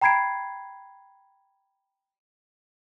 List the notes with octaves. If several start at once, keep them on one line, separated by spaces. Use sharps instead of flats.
G5 A#5 B5 G#6 C7 D7